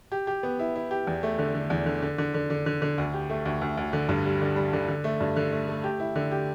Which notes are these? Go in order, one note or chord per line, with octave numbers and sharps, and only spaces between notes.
G4
G4
B3
E4
E4
G4
E2
A3
D3
D3
E2
D3
D3
D3
D3
D3
D3
D3
D2
G4
A3
D2
D2
D2
D3
G2
G3
D3
G3
D3
D3
A3
G2
D3
A3
A3
G4
E4
D3
G4